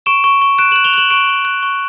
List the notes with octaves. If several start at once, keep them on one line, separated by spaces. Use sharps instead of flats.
C#6 D7 E7
C#6
C#6
F#6 D7 E7
F#6 E7 F#7
F7 G7
F#6 E7 F#7
C#6 D7 E7
C#6
F#6
C#6